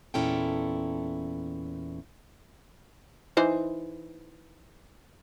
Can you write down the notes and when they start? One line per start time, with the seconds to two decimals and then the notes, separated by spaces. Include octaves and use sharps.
0.14 E2 A#2 C#4 E4 A4 G5
3.37 E3 D#4 C5